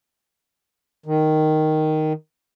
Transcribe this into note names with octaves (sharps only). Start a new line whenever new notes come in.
D#3